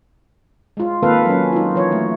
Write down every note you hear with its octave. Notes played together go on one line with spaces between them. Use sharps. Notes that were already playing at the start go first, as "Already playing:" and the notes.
G#3 F4
D#3 A#3 C4 A4 B4 F5
F#3 C#4
D#4 F4
E3 C#5
A3